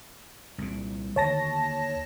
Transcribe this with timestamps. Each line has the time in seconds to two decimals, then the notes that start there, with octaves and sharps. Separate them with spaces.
0.58 C2 A#2
1.16 D#2 D3 D#3 C#5 A5 A#6